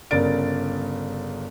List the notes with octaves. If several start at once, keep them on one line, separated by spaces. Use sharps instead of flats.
G1 C#3 A#4 D5 A6 D7